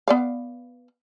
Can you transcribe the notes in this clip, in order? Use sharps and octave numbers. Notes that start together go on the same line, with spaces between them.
B3 D5 F5